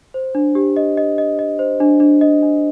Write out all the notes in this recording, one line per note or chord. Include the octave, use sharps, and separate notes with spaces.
C5
D4
G4
D#5
D#5
D#5
D#5
C5
D4
D4
D#5
D4